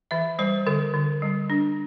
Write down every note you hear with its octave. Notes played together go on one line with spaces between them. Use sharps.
E3 E5
G3 C5
D3 A4
D3
G3
D4